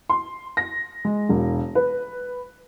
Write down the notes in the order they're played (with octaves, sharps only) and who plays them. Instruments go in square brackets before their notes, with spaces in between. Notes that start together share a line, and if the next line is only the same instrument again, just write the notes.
[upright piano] C6
A#6
G#3
E1
B4